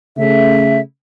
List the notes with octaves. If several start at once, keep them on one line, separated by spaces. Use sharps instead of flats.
C#3 A3 E5